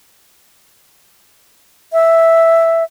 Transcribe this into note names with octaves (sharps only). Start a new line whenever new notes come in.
E5